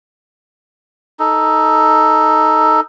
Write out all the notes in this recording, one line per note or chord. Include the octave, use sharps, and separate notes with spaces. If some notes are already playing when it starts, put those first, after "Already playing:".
D#4 A4